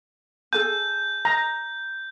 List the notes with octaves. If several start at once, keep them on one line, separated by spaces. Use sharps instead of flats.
G#4 A4 G#5 G6
A#5